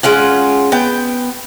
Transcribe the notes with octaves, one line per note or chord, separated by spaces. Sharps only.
G#3 C#4 F4 F#5
B3 G5